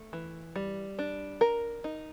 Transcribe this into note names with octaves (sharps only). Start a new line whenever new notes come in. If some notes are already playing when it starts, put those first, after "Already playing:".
Already playing: A3
E3
G3
D4
A#4
D#4